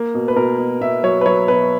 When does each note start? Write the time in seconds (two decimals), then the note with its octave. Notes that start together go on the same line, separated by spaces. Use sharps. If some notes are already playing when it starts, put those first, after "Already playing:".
Already playing: A#3
0.14 B2
0.28 B4
0.36 B2 A#4
0.58 B2
0.81 B2 E5
1.03 F#3 C#5
1.21 B4
1.26 F#3 C#5
1.48 B2 B4